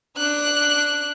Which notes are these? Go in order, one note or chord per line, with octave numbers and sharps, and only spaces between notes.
D4 F#6